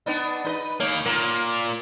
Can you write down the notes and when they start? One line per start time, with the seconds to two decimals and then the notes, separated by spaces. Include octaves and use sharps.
0.06 B3 D4 D#4
0.45 D#4 B4 D#5
0.80 D#3 A#3 C#5
1.05 A#2 A#3